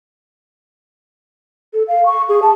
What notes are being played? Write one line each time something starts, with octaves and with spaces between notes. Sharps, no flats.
A4
F5
C#6
G#4
A5